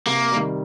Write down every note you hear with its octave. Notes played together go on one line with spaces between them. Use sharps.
C3 A#3
D#3 G3